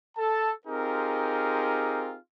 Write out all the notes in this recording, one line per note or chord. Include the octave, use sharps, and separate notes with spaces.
A4 A5
C4 D#4 F4 G4 G#4 A#4